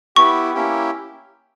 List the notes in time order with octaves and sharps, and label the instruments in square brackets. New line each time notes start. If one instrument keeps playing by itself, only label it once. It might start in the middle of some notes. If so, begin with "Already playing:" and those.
[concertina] B3 E4 G4 [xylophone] C#6
[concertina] A#3 C#4 E4 G4